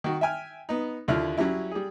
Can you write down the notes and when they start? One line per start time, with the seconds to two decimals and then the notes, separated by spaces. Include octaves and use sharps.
0.04 D#3 F#4
0.21 E5 G5 G#5 F6
0.69 B3 D#4
1.08 D#2 D3 E4 F4 F6
1.37 F#3 G3 C#4 E4
1.71 G3 G#4